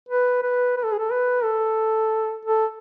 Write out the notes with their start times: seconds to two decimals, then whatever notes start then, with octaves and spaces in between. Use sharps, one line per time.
0.09 B4
0.43 B4
0.77 B4
0.84 A4
0.92 G#4
0.99 A4
1.11 B4
1.44 A4
2.45 A4